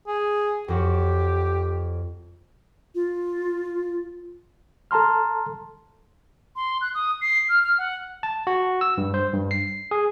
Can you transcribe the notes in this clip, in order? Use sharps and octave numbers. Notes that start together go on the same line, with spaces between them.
G#4
F2 F#4 G4 C#5
F4
A4 A5 A#5 C6 F6
C6
F#6
D#6
C7
F6
F6
F#5
A5
F#4
E6
G2
C5
G2
C7
G#4